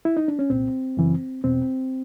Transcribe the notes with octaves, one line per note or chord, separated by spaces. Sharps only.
E4
D#4
D4
C#4
C2 A#2 C4
F#2 C#3 E3
E2 B2 C4